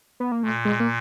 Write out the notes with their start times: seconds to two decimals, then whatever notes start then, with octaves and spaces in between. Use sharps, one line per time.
0.20 B3
0.32 A#3
0.43 A#2 A3
0.65 G#3
0.80 A#3